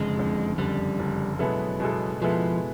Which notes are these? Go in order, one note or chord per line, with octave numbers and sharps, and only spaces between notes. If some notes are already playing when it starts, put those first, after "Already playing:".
Already playing: F#1 F2 D3 G#3
F#1 F2 D3
F#1 F2 D3 G3
F#1 F2 D3
B2 F#3 G#3 B3 E4 A4
B2 G#3 B3 E4 A4
B2 F3 G#3 B3 E4 A4